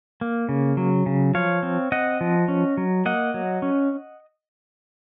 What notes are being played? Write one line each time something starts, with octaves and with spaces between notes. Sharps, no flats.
A#3
C#3
F#3
C#3
F3 C#5 F5
C4
C4 D#5 F#5
F3
C#4
F#3
A#3 D#5 F#5
F#3
C#4